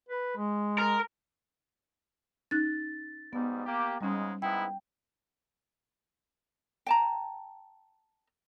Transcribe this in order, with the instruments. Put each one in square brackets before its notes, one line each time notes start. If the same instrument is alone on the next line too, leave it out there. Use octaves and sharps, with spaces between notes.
[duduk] B4
G#3
[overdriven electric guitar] A#4
[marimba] C#4 D#4 F#6 [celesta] A6
[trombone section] G#2 B2 G3 [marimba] B3
[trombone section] A#3 G4
[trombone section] G#2 C#3 G#3 [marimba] G3 C#4
[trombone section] G#2 B3 E4 [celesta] G5
[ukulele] G5 A5 A#5